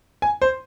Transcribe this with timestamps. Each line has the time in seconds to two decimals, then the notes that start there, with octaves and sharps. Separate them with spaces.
0.22 G#5
0.42 C5